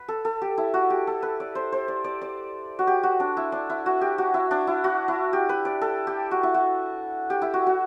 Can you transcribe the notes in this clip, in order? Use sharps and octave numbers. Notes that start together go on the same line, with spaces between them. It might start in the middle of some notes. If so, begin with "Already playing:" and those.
Already playing: B4
A4
A4
G4
E4
F#4
G4
A4
B4
D5
C5
C5
D5
D5
D5
F#4
G4
F#4
D4
E4
D4
E4
F#4
G4
F#4
E4
D4
E4
F#4
E4
G4
B4
D5
A4
G4
F#4
E4
F#4
G4
E4
F#4
F#4